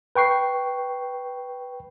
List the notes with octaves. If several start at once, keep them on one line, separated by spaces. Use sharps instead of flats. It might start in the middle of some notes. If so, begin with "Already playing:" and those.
B4 G5 C#6 C7